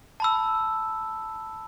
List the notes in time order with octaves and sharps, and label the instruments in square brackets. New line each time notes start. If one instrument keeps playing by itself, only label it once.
[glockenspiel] A5 B5 E6